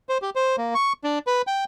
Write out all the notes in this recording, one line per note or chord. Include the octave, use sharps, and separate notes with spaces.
C5
G4
C5
A#3
C#6
D4
B4
G5